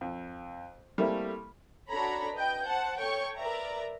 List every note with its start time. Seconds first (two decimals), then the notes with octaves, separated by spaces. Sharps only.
0.01 F2
0.98 G3 A3 A#3 C4 E4 A4
1.89 D4 F#4 A4 C#5 A#5 B5
2.35 B4 D#5 G5 G6
2.65 C5 F#5 A5
2.99 A4 C#5 G5 C#6
3.37 A#4 B4 D5 E5 A#5